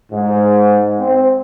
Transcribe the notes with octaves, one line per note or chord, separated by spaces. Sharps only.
G#2
C4